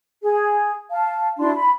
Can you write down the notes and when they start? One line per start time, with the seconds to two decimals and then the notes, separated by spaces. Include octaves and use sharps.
0.22 G#4
0.91 F5 A5
1.39 D4 E4 F#4 C6
1.54 B5